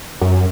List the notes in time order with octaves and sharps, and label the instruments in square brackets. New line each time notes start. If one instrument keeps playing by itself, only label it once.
[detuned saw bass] F#2